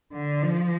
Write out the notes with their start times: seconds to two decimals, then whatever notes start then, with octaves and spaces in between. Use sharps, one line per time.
0.12 D3
0.43 F3